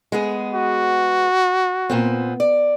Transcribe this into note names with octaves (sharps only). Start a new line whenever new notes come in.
G#3 B3 G#4
F#4
A#2 B3 C4
D5